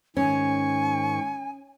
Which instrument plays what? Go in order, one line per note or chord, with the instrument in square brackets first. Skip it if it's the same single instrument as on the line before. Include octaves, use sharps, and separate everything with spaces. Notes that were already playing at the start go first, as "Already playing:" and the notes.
[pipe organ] G#2 D#3 C#6 [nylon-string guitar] C#4 [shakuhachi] G#5